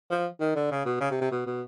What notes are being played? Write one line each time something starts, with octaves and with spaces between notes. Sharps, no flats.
F3
D#3
D3
C#3
B2
C#3
C3
C3
B2
B2